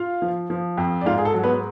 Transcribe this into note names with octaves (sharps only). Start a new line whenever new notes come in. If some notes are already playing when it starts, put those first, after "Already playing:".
Already playing: F4 F5
F3
F3
F2
D5
G#2 F4 F5
G#4
A4
F#3
B3 B4